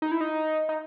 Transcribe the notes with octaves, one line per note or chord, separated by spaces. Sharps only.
D#4
E4
D#4
D#4